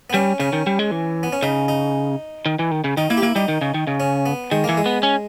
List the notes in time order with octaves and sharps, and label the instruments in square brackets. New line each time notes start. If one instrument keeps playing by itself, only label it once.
[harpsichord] B3
[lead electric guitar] G3 [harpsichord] C#4
[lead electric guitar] C#3 [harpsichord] C#4
[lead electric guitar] D#3
G3
G#3
E3
[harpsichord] B3
C#4
[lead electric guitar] C#3 [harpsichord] D#4
[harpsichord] D#4
[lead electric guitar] D#3
E3
D#3
C#3
[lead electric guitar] D#3 [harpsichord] D#4
[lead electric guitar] A#3 [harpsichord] E4
[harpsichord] G4
[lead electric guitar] A#3 [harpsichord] E4
[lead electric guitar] G3 [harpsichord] D#4
[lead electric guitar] D#3
C#3
D#3
C#3
[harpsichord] C#4
B3
[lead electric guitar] D#3 [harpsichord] G#3
[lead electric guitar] E3 [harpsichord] A#3
[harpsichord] G#3
[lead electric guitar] B3
C#4